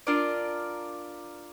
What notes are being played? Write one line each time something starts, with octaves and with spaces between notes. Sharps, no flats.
D4 F4 A#4 D5